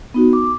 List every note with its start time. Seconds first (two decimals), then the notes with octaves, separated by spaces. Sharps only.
0.14 B3 D#4 F#4
0.33 D6